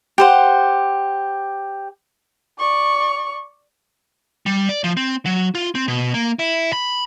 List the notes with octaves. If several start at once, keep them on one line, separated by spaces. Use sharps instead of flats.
G4 C5 F#5
D5 C#6
G3
D5
F3
C4
F#3
F4
C4
B2
A#3
E4
B5